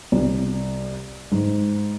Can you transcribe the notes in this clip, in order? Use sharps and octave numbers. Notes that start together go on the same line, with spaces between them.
C2
G#2